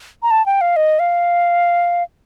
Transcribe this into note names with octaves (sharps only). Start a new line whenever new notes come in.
A#5
A5
G5
F5
D#5
F5